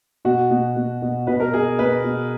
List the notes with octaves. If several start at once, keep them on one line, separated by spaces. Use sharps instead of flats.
B2 F#4
B2
B2
B2
B2 B4
A#4
B2 G#4
B2 B4
B2